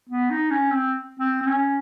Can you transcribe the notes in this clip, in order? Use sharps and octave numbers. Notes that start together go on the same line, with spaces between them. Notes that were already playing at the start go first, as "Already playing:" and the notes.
B3
D#4
C#4
C4
C4
C4
C#4